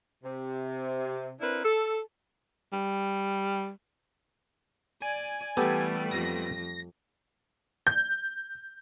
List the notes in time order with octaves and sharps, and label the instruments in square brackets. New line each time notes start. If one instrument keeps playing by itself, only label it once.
[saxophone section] C3
C4 D4 E4 A#4 B4
A4
[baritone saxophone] G3
[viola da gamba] D5 [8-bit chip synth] G#5
[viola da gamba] E3 [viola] G3 A3 [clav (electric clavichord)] B3 G4 A4
[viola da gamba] F2 [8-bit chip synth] A#6
[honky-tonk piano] G6